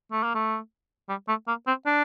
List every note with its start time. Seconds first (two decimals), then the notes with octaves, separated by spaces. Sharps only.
0.12 A3
0.23 A#3
0.35 A3
1.09 G3
1.28 A3
1.48 A#3
1.67 C4
1.86 D4